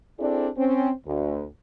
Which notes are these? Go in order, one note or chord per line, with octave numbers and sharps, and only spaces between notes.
C4 D4 E4 G#4 A4 D5
C4 C#4
D2